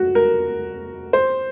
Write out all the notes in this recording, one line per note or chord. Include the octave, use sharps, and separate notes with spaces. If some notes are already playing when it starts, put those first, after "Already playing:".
Already playing: F#4
A#4
C5